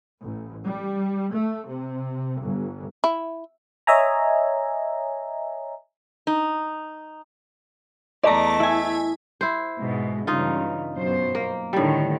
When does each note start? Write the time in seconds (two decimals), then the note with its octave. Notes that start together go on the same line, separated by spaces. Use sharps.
0.21 A1
0.64 G3
1.33 A3
1.65 C3
2.40 G1
3.04 E4
3.87 C#5 D#5 E5 G#5 A#5
6.27 D#4
8.23 E2 A3 D5 D#5 A#5
8.60 E4 G#5
9.41 E4 C5
9.79 G#2 B2 G#3
10.27 G2 C#3 E3 D#4 F4
10.94 F#2 B2 C5
11.35 A#3
11.73 A2 D3 D#3 G3